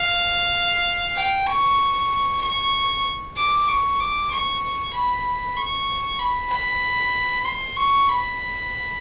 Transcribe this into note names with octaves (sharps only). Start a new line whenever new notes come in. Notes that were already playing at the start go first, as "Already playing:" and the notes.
Already playing: F5
G5
C#6
C#6
D6
C#6
D6
C#6
B5
C#6
B5
B5
C6
C#6
B5